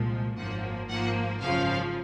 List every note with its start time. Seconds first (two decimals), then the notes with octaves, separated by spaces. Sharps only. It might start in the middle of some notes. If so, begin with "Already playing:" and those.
Already playing: C2 A#2 F3 G#3
0.36 G#1 F#2 F3 A#3 F#5
0.89 G#2 F3 A#3 F#5
1.41 G#1 F#2 C#3 F3 F5